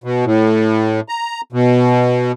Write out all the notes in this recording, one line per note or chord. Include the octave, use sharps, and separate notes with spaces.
B2
A2
A#5
B2